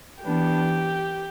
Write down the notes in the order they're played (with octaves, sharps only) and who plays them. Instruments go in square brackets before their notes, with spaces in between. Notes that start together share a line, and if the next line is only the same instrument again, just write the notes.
[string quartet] E3 B3 D4 G4